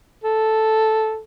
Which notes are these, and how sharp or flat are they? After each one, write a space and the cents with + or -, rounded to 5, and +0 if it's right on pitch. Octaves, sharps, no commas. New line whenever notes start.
A4 -5